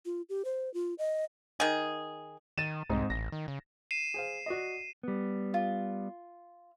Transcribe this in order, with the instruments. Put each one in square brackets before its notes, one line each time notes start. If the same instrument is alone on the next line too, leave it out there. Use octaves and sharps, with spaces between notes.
[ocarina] F4
G4
C5
F4
D#5
[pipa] D#3 G#4
[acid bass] D#3 [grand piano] A6 D#7 E7
[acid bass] C2 [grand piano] G#2 C4 D#4
[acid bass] A1 [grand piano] A#6
[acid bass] D#3
C#3
[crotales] C7 D#7 E7
[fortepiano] G#4 C5 F5
F#4 D5 D#5
[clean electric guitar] G3 B3
[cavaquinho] F4